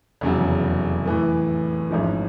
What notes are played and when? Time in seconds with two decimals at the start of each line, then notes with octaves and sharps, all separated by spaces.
0.21 F1 E2 C#3 F#3
1.06 A2 E3 A3
1.90 A1 G#2 F3